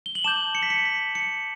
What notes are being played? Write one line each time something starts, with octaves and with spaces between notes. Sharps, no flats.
G7
F#7
A5 D6 G6 E7
C#7
B6
C#7
B6
C#7